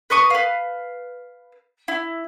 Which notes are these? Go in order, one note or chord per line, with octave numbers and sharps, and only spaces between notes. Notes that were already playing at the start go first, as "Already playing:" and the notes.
B4 D#5 C#6 D#6
B4 F5
E4